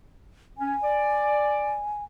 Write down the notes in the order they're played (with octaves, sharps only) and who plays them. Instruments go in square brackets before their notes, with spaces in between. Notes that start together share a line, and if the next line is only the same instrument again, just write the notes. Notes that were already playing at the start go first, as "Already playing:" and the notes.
[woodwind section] C#4 [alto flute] G#5
[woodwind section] D5